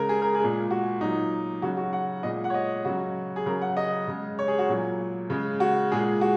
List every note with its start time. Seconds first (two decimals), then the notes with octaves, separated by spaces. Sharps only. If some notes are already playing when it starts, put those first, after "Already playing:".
Already playing: C#3 G#3 A#4
0.09 G#4
0.22 A#4
0.35 G#4
0.40 A#2 G#3
0.71 F#4
1.01 A#2 F#3 D#4
1.62 C#3 F#3 F#4
1.77 F#4
1.93 F#5
2.23 A#2 G#3 D#5
2.44 F#5
2.50 C#5
2.54 D#5
2.85 C#3 F#3 F#4
3.36 G#4
3.46 C#3 F#3 A#4
3.62 F#5
3.77 D#5
4.08 C#3 G#3
4.39 C#5
4.48 G#4
4.59 F#4
4.69 A#2 F#3
5.30 C#3 G#3
5.60 F#4
5.92 A#2 G#3 G#4
6.21 F#4